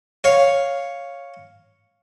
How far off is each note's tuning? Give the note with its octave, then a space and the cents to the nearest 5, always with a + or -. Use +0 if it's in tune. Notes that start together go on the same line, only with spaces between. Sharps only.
C#5 +0 F5 +0